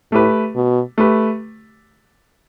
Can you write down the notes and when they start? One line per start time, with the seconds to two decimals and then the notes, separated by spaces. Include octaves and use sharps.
0.12 A2 A3 G4 B4
0.56 B2
0.98 A3 G4 B4